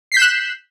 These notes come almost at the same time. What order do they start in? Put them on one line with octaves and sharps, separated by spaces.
C7 B6 G6 E7 F#6